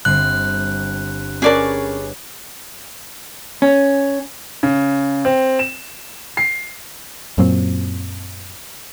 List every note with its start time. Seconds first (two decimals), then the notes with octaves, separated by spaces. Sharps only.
0.05 G1 C4 F#6
1.42 C#4 G#4 A#4 B4 C#5 D5 A5
3.62 C#4
4.63 C#3
5.25 C4
5.59 E7
6.37 C7
7.38 F#2 A#2 F#3 C4